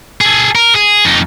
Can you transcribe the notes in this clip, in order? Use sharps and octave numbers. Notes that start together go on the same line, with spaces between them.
G#4 A4
A#4
G#4
F2 D#4